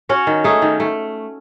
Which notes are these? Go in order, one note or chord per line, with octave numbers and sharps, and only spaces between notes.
C#4 F#4 C#5
D#3
A3 D#4 G#4
D#3
A3